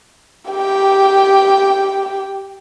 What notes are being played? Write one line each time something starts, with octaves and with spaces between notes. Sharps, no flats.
G4 G5